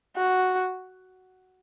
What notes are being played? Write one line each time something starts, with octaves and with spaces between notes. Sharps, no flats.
F#4